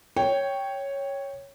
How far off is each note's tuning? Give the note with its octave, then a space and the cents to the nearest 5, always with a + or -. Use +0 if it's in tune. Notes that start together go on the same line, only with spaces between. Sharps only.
C#5 +0 G5 +0